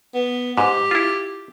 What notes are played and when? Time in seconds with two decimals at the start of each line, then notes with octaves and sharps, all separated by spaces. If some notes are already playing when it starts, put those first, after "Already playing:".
0.14 B3
0.58 G#2 G4
0.91 E4 F4